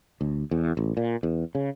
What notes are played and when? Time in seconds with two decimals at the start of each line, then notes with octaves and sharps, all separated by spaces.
0.21 D2
0.51 E2
0.77 A1
0.97 A#2
1.23 E2
1.55 C#3